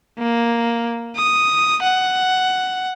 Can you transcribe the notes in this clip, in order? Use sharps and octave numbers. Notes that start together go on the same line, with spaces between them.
A#3
D#6
F#5